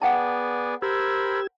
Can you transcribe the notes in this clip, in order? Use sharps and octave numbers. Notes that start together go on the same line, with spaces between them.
B3 G#4 D5 F#5 G5 A5
G4 A#4 C5 B5 E6 G#6